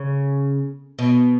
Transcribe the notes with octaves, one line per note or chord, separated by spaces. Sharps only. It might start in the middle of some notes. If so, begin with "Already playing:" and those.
Already playing: C#3
B2